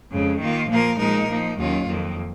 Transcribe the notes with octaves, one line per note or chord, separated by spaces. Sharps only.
F2 C#3 G#3
D#3 A#3 F4
A#2 F3 A#3 F4 A#4
A#2 F3 G#3 D#4 A#4
F3 A#3 D#4
D#2 D#3 F#3 C#4 F4
F2 D#3 A#3